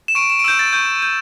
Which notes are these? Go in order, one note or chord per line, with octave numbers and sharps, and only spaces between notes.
E7
C#6 D7
E7
D7
E6 G6 E7
A6
C#6 G6
G6